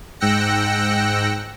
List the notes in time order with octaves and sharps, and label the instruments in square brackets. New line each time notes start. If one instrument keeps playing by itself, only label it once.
[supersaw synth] G#2 G5 E6 F#6 A#6 C#7